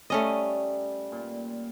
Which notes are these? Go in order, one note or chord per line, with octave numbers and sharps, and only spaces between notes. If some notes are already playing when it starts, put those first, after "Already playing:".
G3 A3 C#4 D#5
A#2